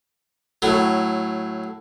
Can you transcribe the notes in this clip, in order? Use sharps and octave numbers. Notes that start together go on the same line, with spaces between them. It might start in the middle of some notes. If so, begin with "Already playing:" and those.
A2 F#3